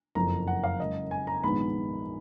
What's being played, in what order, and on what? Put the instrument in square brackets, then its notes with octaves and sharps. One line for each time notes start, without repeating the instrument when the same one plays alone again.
[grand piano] F#1 F2 F3 A#5
F#5
F5
F#2 C#3 G#3 D#5
G#5
A#5
A#1 G#2 D#3 G#3 B3 B5